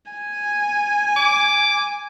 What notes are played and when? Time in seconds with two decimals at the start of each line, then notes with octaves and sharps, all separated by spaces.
0.12 G#5
1.16 D6